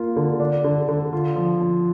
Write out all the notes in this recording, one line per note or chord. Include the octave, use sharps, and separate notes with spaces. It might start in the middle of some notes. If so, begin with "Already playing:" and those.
Already playing: A#3 F4
D3
D4
D3
D3
F4
F3
F3